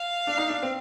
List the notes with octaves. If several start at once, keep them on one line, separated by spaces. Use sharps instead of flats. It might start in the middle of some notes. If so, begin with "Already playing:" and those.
Already playing: F5
D4
D#4
D4
C4